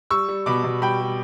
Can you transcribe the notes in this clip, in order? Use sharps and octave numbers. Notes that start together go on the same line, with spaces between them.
G3 C#6 E6
G3
B2 B5 D6
B2
G3 G5 B5
G3